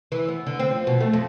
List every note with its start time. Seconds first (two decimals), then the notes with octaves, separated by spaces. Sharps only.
0.12 E3
0.28 B3
0.47 D3
0.59 C4
0.71 F3
0.87 B2
1.01 A3
1.13 F2